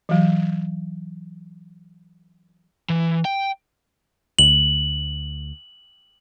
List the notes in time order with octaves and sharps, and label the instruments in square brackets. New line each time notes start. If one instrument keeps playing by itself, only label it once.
[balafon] E3 F#3
[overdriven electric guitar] E3
G5
[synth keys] D2 [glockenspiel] F#7